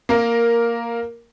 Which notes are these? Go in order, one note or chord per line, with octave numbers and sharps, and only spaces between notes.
A#3 A#4